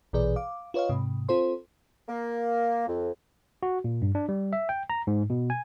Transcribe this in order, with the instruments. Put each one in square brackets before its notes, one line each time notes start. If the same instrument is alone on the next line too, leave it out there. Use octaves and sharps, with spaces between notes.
[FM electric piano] A#1 B2 E3 G#4 B4 D5
F5 D6
F4 B4 C#5 D#5 F5
G#2 C3
C4 F4 A4 C5 C6
[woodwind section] A#3
F2
[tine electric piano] F#4
A#2
G2
D4
G3
E5
G5
A#5
G#2
B2
G#5